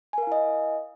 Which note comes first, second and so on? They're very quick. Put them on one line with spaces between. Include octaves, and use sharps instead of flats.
G#5 A#4 F5 E4 D#5